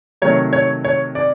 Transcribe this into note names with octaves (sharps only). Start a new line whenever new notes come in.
C3 D#3 F#3 A3 C#5
C#5
C#5
D5